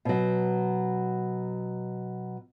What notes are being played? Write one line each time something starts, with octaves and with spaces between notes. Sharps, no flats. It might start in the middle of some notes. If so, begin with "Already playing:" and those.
B2 F#3